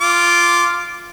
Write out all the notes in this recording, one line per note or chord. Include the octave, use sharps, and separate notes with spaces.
F4 D6